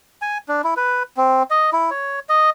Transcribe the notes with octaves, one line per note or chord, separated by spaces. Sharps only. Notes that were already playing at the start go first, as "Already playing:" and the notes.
G#5
D4
E4
B4
C4
D#5
E4
C#5
D#5